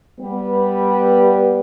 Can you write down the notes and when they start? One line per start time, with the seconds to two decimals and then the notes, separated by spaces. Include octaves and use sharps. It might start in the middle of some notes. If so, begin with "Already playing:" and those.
0.19 G3 B3